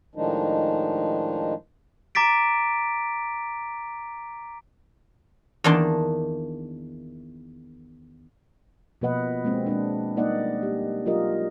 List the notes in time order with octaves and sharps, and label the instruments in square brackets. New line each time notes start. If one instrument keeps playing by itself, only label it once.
[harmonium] A2 D#3 F3 G#3 D4 D#4
[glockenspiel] A#5 D6 A6 B6 D7
[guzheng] E2 D#3 A#3 D4 A5 C6
[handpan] B2 F3 A#3 B4 D#5 F#5
G#3 A#3 C4
G#3 C4 D4
G3 A#3 D#4 D5 D#5 F#5
G4
F#3 F4 G4 A#4 D#5